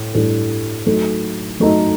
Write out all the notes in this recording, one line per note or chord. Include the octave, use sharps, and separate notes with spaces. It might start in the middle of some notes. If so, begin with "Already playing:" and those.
Already playing: A2
A2 G3 D4 A4
F#3 A3 D#4 A4
F#3 A3 D#4 A4